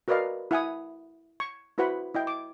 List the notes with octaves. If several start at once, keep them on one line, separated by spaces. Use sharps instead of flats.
F#4 A#4 B4 D5 D#5 F5
E4 F#5 G#5 D#6
C#6
E4 F#4 B4 C5 F#5 B5
E4 D#5 G5
D6